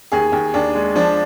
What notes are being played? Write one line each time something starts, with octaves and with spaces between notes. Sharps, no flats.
D#2 G#4
D#2
D#2 D4
G#3
F3 D4